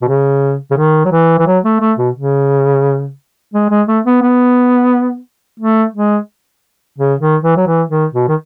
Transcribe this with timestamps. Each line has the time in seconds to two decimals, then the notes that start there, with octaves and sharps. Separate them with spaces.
0.02 B2
0.08 C#3
0.71 C#3
0.77 D#3
1.05 F#3
1.11 E3
1.39 E3
1.47 F#3
1.64 A3
1.81 A3
1.97 B2
2.15 C#3
3.54 G#3
3.70 G#3
3.87 A3
4.05 B3
4.22 B3
5.60 A3
5.94 G#3
6.98 C#3
7.20 D#3
7.43 E3
7.56 F#3
7.66 E3
7.89 D#3
8.13 B2
8.28 D#3